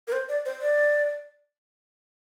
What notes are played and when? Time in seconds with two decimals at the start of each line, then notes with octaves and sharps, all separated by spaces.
0.08 A#4
0.12 C5
0.29 D5
0.45 C5
0.61 D5